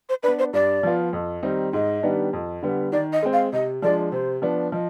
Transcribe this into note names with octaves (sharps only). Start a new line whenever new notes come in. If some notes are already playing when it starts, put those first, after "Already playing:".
C5
B3 D4 B4
C5
G2 D5
F3 B3 F4
F2
D#3 G3 C4 D#4
G#2 D#5
D#3 G3 B3 D4
F2
D3 G3 B3
D#3 D5
D#5
G#3 C4
F5
C3 D#5
F3 G#3 D4 D5
C3 C5
F3 B3 D4
F3 D#5